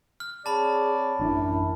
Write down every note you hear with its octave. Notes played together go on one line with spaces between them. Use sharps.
F6
C4 G#4 C#5 D5 A5 B5
A1 F#2 D4 E4